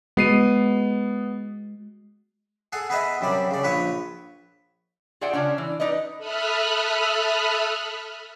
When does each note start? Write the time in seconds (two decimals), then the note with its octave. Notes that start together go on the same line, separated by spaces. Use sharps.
0.17 G#3 B3 F#4 C7 D#7
2.72 G#4 A4 F#5 G#5
2.90 B3 G#4 B4 D#5 E5 F#5
3.21 F#2 C3 G3 D5
3.51 C#3 D5
3.63 A#1 F3 B4 C#5 C#6
5.21 F4 G#4 D5 E5 F#5 G5
5.33 C#3 C#4 D4
5.58 E3
5.80 D#4 B4 D5 D#5
6.18 A4 E5 B5 D#6 F6 F#6